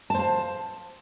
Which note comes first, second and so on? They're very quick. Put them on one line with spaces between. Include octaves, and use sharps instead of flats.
A5 C5 F5